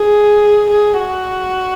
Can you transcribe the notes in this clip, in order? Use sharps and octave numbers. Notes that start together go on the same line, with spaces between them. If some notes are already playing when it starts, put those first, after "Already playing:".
Already playing: G#4
G#4
F#4